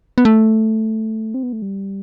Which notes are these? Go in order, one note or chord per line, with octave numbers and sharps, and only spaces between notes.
B3
A3
C4
B3
A3
G3